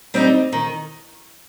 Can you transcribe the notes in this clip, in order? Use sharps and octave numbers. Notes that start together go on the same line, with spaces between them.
G3 C4 D#4
D#3